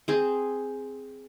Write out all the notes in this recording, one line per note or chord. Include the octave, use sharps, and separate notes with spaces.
C4 G#4